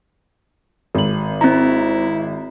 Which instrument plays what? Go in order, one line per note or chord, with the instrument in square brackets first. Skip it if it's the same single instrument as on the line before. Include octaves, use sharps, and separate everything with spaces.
[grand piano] G#1 F#7
[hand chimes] C4 A#5 [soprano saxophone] E4